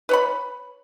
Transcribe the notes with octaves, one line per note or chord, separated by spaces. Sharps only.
B4 C#5 B5